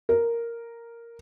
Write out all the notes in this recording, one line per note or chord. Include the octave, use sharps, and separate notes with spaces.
A#4